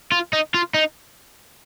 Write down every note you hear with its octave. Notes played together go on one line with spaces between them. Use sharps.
F4
D#4
F4
D#4